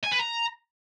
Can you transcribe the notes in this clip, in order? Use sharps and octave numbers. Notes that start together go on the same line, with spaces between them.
G#5
B4
A#5